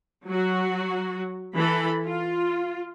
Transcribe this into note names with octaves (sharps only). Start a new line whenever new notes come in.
F#3 F#4
E3 A4 B5
F4